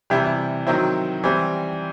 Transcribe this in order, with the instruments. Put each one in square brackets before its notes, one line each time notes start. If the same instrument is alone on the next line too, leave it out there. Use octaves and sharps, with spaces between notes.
[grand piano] C3 E3 G3 E4 G4
E4
D#3 F#3 C4 E4
E3 G3 C4